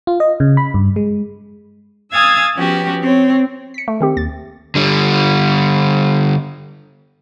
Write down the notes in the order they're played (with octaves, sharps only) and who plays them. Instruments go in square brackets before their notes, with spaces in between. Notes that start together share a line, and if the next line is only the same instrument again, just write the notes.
[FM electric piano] F4
D#5
C#3
B5
G2
G#3
[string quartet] F5 G#5 D#6 E6 G#6 A6
F3 B3 C#4 F#4 G4
C4 C#5
[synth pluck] B6 C#7
A3
D#3 C4 G4
D#2 A6
[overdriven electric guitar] D3 G3